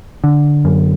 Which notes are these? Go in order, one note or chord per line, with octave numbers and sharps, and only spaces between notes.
D3
F#2